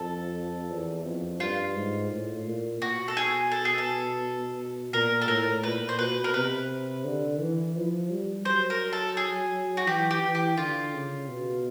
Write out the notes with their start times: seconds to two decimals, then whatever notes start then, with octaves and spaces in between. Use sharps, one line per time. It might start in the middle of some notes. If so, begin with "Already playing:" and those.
Already playing: F2 A4
0.70 E2
1.05 F2
1.40 G2 F4
1.76 G#2
2.11 A2
2.46 A#2
2.81 B2 F#4
3.08 A4
3.17 G#4
3.52 A4
3.65 G#4
3.78 A4
4.93 A#2 A#4
5.22 A4
5.28 A2 A#4
5.64 A#2 B4
5.89 C5
5.99 B2 B4
6.24 A#4
6.34 C3 B4
7.05 D3
7.40 E3
7.76 F3
8.11 G3
8.45 F#3 C5
8.70 A#4
8.93 A4
9.17 G#4
9.77 F#4
9.87 E3 G4
10.11 G4
10.22 E3
10.35 G4
10.57 D3 F4
10.94 C#3
11.29 B2